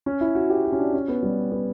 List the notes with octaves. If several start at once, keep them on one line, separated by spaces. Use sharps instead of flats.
C#4
E4
F#4
G4
F#4
C#4
D4
C#4
B3
G3
B3